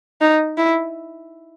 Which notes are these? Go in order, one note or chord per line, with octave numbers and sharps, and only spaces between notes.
D#4
E4